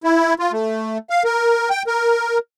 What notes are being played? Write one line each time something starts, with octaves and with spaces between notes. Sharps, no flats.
E4
F4
A3
F5
A#4
G5
A#4